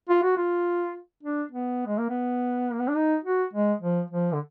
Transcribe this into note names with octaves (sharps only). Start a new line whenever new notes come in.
F4
F#4
F4
D4
B3
G#3
A#3
B3
A#3
B3
D4
D#4
F#4
G#3
F3
F3
D3